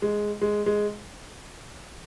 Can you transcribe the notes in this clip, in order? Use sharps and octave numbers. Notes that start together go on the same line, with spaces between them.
G#3
G#3
G#3